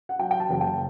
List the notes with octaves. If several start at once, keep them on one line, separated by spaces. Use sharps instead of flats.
F#5
F#3 G5
G5
A5
F#1
G5